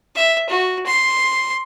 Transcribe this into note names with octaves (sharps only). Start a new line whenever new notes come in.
E5
F#4
C6